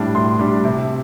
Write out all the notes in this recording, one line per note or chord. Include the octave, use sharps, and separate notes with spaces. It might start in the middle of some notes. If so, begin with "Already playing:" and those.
Already playing: A2 G3 D4
A2 C6
G3 D4
C3